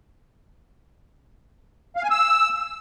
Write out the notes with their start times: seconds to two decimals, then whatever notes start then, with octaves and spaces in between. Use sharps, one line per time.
1.96 F5
2.03 G#5
2.10 E6